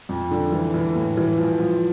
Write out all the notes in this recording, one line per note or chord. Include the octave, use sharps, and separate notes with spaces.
F2
D3
E3
E3
A2
E3
F3
F3